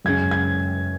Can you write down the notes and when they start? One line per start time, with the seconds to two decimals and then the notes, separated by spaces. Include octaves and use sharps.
0.05 F#2 C#3 G#3 C#4 G#6
0.31 G#6